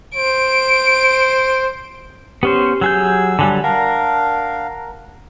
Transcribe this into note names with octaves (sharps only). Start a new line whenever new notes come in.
C5 D7
B3 C#4 G4 C5
F#3 G#4 E6 G6
D3 F#3 G3 G#5 A5
D4 A#4 F5 F#5